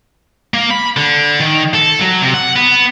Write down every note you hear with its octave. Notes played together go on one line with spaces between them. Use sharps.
A#3
B5
D3
D#3
A4
F#3
C3
F#5
B3